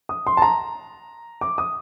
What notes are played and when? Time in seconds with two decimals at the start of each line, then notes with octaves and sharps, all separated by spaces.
0.09 D#6
0.27 C6
0.37 A5
0.42 A#5
1.41 D6
1.58 D#6